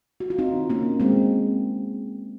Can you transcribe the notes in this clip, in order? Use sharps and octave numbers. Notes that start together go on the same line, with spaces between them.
F#4
F4
C4 D#4
A#3 C#4
G#3 C4